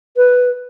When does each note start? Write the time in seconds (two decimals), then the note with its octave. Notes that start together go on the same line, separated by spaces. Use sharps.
0.17 B4